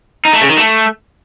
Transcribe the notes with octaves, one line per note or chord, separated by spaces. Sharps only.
D#4
A3
C#3
D#3
A3